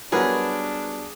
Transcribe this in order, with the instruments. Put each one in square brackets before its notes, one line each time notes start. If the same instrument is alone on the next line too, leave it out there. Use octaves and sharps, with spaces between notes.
[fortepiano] F#3 A#4 B4 [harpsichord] G3 B3 F#4 [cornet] D4 [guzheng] G#4